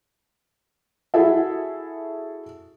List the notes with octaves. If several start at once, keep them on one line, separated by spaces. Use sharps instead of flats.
E4 F#4 G#4 A4 E5